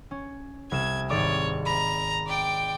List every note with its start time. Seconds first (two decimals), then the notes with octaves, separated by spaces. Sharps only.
0.11 C#4
0.71 C2 F6 G#6 E7
1.10 G#1 C#5 D5 D6
1.66 A#5 B5
2.28 D5 G5